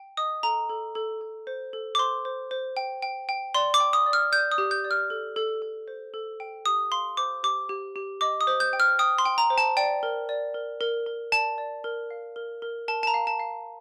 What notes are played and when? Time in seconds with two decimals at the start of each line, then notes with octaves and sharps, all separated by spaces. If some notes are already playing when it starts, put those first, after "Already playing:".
Already playing: G5
0.17 D#5 D#6
0.43 A4 A#5
0.69 A4
0.95 A4
1.21 A4
1.47 C5
1.73 A4
1.95 D6
1.99 C5 C6
2.25 C5
2.51 C5
2.77 G5
3.02 G5
3.29 G5
3.55 D5 C6
3.74 D6
3.80 G5
3.93 D#6
4.06 D5
4.13 F6
4.32 D5 G6
4.52 D#6
4.58 G4
4.71 G6
4.85 D5
4.91 F6
5.10 A4
5.36 A4
5.62 A4
5.88 C5
6.14 A4
6.40 G5
6.66 G4 D#6
6.91 F5 C6
7.17 C5 D6
7.43 G4 D6
7.69 G4
7.96 G4
8.21 D#5 D6
8.41 D#6
8.47 C5
8.60 G6
8.73 G5
8.80 F6
8.99 G5 D#6
9.18 C6
9.26 G5
9.38 A#5
9.50 C5
9.58 A5
9.77 D5 G5
10.03 A#4
10.29 D5
10.54 A#4
10.81 A#4
11.06 A#4
11.32 D5 A5
11.58 D5
11.84 A#4
12.11 F5
12.36 A#4
12.62 A#4
12.88 A#4 A5
13.03 A5
13.07 A#5
13.14 F5
13.27 A5
13.40 F5